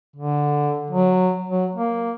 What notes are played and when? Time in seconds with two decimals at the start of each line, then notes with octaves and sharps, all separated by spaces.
0.16 D3
0.90 F#3
1.49 F#3
1.75 A#3